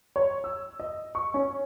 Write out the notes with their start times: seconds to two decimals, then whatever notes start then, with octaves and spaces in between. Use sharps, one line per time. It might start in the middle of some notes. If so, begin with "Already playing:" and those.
0.16 C#5
0.44 E6
0.80 D#5
1.15 C#6
1.34 C#4